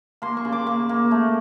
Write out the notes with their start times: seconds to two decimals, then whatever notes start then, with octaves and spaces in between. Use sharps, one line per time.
0.22 A#3 C6
0.37 C#6
0.45 C#3
0.52 D6
0.67 A#3 C#6
0.89 A#3
1.11 A3